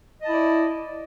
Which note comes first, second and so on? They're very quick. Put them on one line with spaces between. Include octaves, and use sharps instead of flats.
D#5 A5 E4 D5